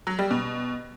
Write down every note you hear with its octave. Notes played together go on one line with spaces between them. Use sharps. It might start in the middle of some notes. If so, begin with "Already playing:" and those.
F#3
G3
B2